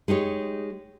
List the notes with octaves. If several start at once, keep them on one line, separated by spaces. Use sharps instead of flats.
G#3 D#4 G4 C#5